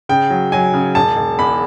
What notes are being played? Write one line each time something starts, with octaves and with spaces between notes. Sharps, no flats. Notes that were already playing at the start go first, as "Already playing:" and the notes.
C#3 G5
F#3
F#3 G#5
C#3
E1 A5
E1
E2 B5